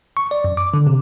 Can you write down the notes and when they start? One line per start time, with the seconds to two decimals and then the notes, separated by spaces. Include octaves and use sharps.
0.17 C#6
0.31 D5
0.44 F#2
0.57 D6
0.74 D3
0.86 C3